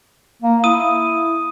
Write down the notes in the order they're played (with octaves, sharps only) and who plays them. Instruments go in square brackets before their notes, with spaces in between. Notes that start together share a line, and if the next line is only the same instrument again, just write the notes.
[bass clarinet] A#3
[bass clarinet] E4 [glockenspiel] D#6 D#7